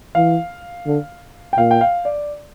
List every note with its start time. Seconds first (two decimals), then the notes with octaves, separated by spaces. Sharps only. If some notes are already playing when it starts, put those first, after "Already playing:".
0.15 E3 F5
0.87 D3
1.53 G5
1.58 A#2 F5
1.71 G5
1.81 F5
2.05 D5